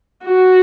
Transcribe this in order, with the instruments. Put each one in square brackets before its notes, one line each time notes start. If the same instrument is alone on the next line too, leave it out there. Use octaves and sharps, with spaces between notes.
[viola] F#4